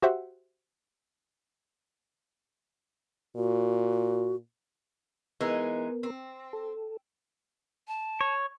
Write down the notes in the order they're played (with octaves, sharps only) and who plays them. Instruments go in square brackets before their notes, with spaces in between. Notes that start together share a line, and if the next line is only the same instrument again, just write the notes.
[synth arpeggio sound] F#4 G4 C5 E5 F#5
[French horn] A#2 [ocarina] F#4
[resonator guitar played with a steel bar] E3 G#3 D#4 [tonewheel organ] B3 A#4
[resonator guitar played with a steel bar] C4
[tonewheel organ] A4
[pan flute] A5
[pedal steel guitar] C#5